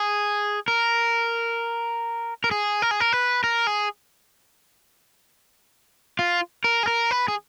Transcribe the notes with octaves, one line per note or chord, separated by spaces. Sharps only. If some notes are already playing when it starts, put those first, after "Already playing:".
Already playing: G#4
A#4
A#4
G#4
A#4
G#4
A#4
B4
A#4
G#4
F4
A#4
G#4
A#4
B4
G#4